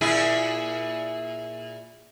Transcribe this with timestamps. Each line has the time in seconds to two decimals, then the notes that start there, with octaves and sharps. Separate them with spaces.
0.01 A#2 E4 G#4